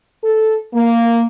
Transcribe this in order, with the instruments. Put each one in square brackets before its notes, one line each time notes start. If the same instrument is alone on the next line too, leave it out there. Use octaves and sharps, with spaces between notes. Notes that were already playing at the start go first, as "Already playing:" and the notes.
[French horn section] A4
A#3